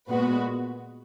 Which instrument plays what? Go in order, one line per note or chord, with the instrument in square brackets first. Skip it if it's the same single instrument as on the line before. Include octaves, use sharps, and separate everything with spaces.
[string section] A#2 G#3 B3 F#4 B4